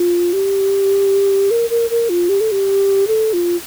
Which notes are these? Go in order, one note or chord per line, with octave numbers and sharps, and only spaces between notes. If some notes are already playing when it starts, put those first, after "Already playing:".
Already playing: F4
G4
A#4
A#4
A#4
F4
G4
A4
G4
A4
F4